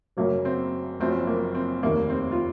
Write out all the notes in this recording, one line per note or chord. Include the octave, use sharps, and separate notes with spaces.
F#1 F#2 C#3 F#3 A#3
C4
F#1 F#2 F3 C4
A#3
C4
F1 D#2 D#3 A#3
C4
F4